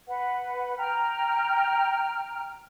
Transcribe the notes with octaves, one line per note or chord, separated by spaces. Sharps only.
B4 F#5
G5 A#5 F6